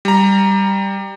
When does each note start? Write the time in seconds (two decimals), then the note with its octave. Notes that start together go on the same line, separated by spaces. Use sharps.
0.05 G3 A#5